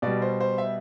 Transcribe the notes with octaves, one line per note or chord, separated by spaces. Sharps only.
B2 G3 D5
C5
C5
E5